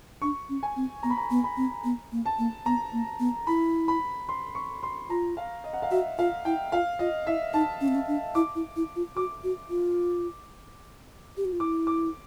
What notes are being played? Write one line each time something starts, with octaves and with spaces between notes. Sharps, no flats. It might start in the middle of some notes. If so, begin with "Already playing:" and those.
D4 C#6
C#4
G#5
C4
B3 A#5
B5
A#5
B3
B5
C4
B3
A#3
A5
A#3
B3 A#5
A#3
B3
E4 B5
B5
C6
C#6
C6
F4 A#5
F5
D#5
F#5
F5
F#4 E5
F4 F5
E4 G5
F4 F5
F4 D#5
E4 E5
D#4 A5
C#4
C4
C#4
D4
E4 D6
E4
E4
F4
F#4 D6
F#4
F4
G4
F#4
F4
E4 D6
D6